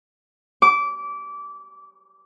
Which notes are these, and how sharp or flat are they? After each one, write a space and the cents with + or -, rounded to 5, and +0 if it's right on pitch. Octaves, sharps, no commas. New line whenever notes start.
D6 -20